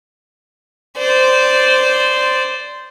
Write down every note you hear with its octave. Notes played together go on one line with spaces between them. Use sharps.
C5 D5